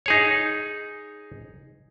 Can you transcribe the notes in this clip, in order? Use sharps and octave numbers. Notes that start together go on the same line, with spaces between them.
D#4 G#4 C#5